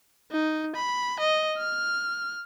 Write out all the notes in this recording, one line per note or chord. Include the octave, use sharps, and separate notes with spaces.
D#4
B5
D#5
F6